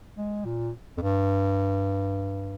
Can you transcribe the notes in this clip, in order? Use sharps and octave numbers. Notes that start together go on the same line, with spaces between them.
G#3
A#2
F2
G2